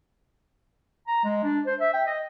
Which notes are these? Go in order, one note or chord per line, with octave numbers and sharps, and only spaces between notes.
A#5
G#3
D4
C5
E5
G5
D#5